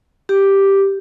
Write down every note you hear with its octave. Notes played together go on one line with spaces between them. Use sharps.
G4